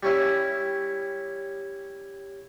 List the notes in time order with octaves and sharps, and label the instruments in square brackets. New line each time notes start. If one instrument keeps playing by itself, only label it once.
[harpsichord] G3 C#4 E4